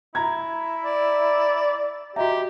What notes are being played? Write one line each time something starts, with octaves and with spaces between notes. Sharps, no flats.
E4 A#5 G#6
D5
F#4 G4 D#5 E5 A#5